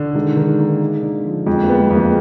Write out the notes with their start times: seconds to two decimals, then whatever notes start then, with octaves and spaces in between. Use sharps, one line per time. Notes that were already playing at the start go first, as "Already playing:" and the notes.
Already playing: D3
0.14 D#3 G#3
0.36 D#3
0.59 A#3
0.81 D#4
1.02 D3
1.25 F3
1.46 F2 G#3
1.64 A#3
1.69 B3
1.80 G#3
1.90 F2
1.96 A#3